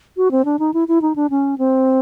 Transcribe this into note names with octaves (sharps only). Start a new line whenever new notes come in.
F#4
C4
D4
D#4
E4
E4
D#4
D4
C#4
C4